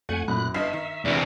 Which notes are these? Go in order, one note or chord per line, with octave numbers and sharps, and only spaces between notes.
F2 A3 F#5 G#5
F#2 A#2 B5 F#6
G1 G2 D#5 E5 F6 C7
D#3 E5
E2 C3 D4